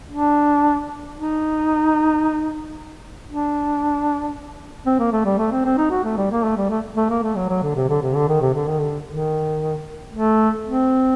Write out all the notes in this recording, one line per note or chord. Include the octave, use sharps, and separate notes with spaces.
D4
D#4
D4
C4
A#3
A3
G3
A3
C4
C4
D#4
F#4
A3
G3
A#3
A3
G3
A3
A3
A#3
A3
F#3
F#3
D3
C3
D3
C3
D3
D#3
C3
D3
D#3
D3
D#3
A3
C4